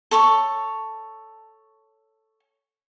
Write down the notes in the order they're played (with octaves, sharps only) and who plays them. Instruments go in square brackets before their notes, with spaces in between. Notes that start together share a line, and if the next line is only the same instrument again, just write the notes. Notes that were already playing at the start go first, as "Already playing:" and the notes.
[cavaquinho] A4 C#5 A5 C#6